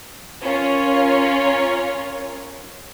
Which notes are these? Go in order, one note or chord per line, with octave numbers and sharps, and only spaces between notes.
C#4 F4 A#4 C#5